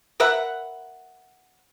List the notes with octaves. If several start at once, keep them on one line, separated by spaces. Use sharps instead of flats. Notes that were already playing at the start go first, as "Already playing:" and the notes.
A#4 B4 E5 F#5